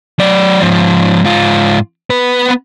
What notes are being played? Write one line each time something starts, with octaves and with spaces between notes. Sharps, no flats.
F#3 D5
G#2 F3
G#2 F4
B3 B4